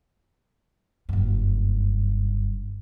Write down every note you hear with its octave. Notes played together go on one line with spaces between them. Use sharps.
F#1 G2